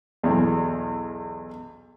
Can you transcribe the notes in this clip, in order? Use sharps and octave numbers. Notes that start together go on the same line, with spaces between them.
B1 E2